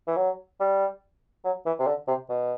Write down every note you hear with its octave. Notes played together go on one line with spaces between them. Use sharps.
E3
F#3
G3
F#3
E3
C3
D3
C3
B2